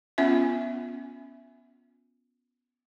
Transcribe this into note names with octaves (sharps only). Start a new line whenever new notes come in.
B3 C#4 F4 E5